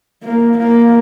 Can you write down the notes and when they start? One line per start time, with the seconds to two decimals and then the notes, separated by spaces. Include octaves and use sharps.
0.23 A#3
0.58 A#3